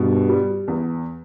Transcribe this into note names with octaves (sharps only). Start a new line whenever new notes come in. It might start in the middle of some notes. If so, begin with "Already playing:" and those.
Already playing: G2 B2
G3
E2